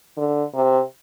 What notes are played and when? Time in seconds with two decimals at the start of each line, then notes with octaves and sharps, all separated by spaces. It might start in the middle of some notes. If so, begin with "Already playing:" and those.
0.17 D3
0.54 C3